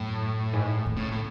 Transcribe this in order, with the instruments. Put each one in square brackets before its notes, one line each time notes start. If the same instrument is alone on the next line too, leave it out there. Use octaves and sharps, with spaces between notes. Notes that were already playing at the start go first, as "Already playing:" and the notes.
Already playing: [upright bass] F#2 [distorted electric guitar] A2
[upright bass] G#2
D#3
[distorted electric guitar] A2 [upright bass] C#3
[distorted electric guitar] A2